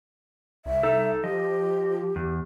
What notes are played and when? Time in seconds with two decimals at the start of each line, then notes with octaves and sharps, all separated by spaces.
0.66 C2 E5
0.83 D#4 A4
1.24 F3 G4 D#5
2.16 E2